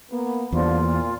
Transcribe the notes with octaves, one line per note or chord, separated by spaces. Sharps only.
A#3 B3
E2 D3 F3 G3 A#3 F4
A#2